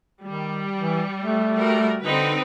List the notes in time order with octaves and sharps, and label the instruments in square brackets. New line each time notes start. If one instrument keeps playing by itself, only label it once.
[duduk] D#3 [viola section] G3
[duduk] E3
A3
[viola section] G3 F#4 A#4
[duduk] D3 [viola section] C4 D#4 B4